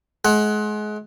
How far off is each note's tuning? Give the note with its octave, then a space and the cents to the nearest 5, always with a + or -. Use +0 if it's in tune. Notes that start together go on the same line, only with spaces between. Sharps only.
G#3 +30 F#5 +0